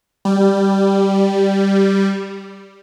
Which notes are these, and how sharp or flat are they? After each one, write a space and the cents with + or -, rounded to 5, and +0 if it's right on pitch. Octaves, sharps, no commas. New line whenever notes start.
G3 +0